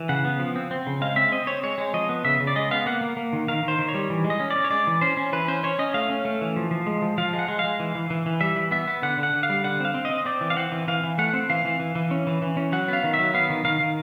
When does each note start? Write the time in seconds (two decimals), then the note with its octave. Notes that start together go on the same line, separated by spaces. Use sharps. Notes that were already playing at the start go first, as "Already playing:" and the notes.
Already playing: E3
0.09 C#3 F#5
0.25 B3
0.39 F3
0.56 C4
0.71 C4
0.87 C#3
1.02 G#3 F5
1.16 C4 E5
1.32 C4 D#5
1.47 C4 C#5
1.63 G#3 C#5
1.78 G#3
1.94 F3 D#5
2.09 B3
2.25 C#3 E5
2.40 C#3
2.47 D5
2.56 G#3 D#5
2.71 B3 F5
2.86 A#3 F#5
3.01 A#3
3.17 A#3
3.33 D#3
3.48 D#3 F5
3.63 D#3
3.68 C5
3.79 D#3
3.89 C#5
3.94 G3
4.10 E3
4.24 G#3
4.30 D#5
4.40 C#4
4.51 D5
4.56 C#4
4.65 C#5
4.71 G#3 D5
4.87 E3
5.01 C#4 C5
5.17 C#4
5.33 E3 B4
5.48 C#4 C5
5.63 C#4 C#5
5.79 C#4 D#5
5.94 A3 F5
6.10 C#4
6.25 A3
6.41 E3
6.56 F3
6.71 F3
6.86 G#3
7.02 F3
7.18 F3 F5
7.33 G#3
7.39 F#5
7.48 G#3
7.59 G#3 F5
7.80 E3
7.95 E3
8.10 E3
8.26 E3
8.41 G3 E5
8.56 E3
8.71 B3 E5
8.88 B3
9.03 D3 F#5
9.17 D3
9.23 F#5
9.34 D3
9.43 F5
9.49 G3
9.64 D3 F#5
9.80 C4 F5
9.95 C4
10.05 D#5
10.10 C4
10.25 C4 D5
10.41 E3
10.50 F5
10.56 C4 F#5
10.72 E3
10.88 E3 F5
11.04 E3
11.18 A3 F#5
11.33 C4
11.50 E3 F5
11.65 E3
11.80 E3
11.95 E3
12.11 C#4
12.27 E3
12.42 E3
12.57 C#4
12.72 F#3 F#5
12.88 B3 F5
13.03 D#3
13.14 E5
13.19 F#3
13.34 B3 F5
13.50 D#3
13.65 D#3 F5
13.80 D#3